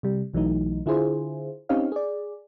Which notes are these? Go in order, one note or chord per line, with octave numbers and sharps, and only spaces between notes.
C3 G3
B1 E3 F#3 A3 D#4
D3 E4 F4 G#4 C5
C4 C#4 D#4 G4 C#5 F5
G#4 D5